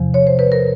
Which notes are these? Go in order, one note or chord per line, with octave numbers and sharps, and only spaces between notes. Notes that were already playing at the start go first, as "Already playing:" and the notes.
Already playing: E2 C3 F3
C#5
C5
B4
A#4